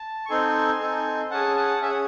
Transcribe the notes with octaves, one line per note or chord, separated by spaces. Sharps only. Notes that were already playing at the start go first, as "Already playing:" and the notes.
Already playing: A5
C#6
C4 D#4 A4 G#5 C6
C4 D#4 A4
C#4 G#4 F#5 A5
F#5 A5
C#4 G#4 E5
F#5